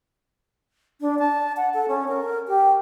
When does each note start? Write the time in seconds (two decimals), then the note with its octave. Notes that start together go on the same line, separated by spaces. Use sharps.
1.01 D4
1.19 A5
1.57 F#5
1.74 A4
1.88 C#4
2.08 A#4
2.48 G4